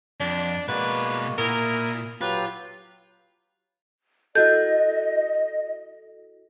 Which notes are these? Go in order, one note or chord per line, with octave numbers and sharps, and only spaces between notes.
F2 D4
B2 G#3 A#3 F#4 B4 D5
A#2 E4 A#4 A#5 D#6
F#3 F4 G4 B4
E4 F#4 A4 D#5 G6